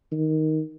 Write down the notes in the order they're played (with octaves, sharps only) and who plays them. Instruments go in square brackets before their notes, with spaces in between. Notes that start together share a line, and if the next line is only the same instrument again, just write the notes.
[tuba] D#3